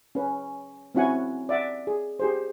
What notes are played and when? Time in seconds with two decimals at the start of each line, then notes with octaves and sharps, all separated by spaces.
0.15 C#4 B4
0.95 C4 C#4 E4 F#4 F#5 G#5
1.49 D5 E5 F#5
1.87 G#4
2.19 G4 G#4 C5